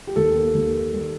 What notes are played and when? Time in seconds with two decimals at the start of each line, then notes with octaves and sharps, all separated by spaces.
0.07 G4
0.16 D#2 A4
0.35 A#3
0.55 D#2
0.74 D#3
0.93 G3